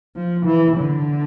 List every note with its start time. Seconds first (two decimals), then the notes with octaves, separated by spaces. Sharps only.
0.16 F3
0.46 E3
0.77 D3